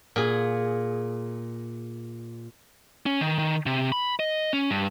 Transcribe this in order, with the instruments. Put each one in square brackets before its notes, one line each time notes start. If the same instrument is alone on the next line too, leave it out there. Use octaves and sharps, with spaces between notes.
[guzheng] A#2 G#4
[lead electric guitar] C#4
D#3
D#3
C3
B5
D#5
C#4
G2